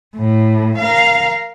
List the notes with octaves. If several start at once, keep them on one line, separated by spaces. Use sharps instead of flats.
A2
A#4 F5